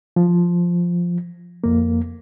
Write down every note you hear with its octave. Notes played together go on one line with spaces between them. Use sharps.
F3
F2 A#3